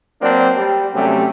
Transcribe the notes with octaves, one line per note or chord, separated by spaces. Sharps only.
F#3 A#3 C4 D4
G3
C3 F#3 G3 A3 C#4